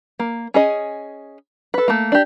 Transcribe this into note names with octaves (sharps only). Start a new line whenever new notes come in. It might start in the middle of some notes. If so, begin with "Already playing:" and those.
A#3
C#4 G#4 D#5
A4 B4
A3 A#3
D4 G4